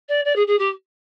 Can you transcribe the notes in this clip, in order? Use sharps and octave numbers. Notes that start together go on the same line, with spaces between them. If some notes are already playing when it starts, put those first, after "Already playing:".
D5
D5
G#4
G#4
G4